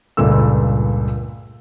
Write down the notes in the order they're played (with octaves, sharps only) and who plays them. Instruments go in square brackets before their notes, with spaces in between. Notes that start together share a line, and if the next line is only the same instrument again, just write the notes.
[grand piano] C#2 G2 A#2 A3 E6